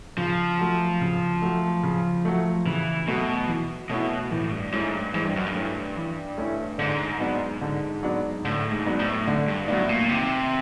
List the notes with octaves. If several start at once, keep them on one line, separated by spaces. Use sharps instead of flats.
C#3 F3
F#3 A3
C#3
F#3 A3
C#3
F#3 A3
C#3 E3
B2 F#3 A3
E3
B2 A3 C#4 E4
A2 E3
G2
G#2 A3 C#4 E4
G2
G#2 E3
G2
F#2
G2
A3 C#4 E4
E3
A3 C#4 E4
G#2 D3
F#3 B3 D4
D3
F#3 B3 D4
A2 D3
G#2
F#3 B3 D4
A2
D3
G2
A2 F#3 B3 D4
A#2
C3 D#3